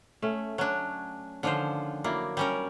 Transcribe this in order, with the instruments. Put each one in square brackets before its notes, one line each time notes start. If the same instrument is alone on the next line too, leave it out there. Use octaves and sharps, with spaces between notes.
[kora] A3 C#4
[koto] F#3 D4 [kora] C#4
[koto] D3 F3 C5 [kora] D#3 C#4 D4
[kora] F#3 E4 D5 [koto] A#3
[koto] G3 C#4 A#4